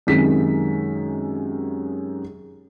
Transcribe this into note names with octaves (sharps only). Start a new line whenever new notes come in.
F#2 C3 D#3 G#3 B6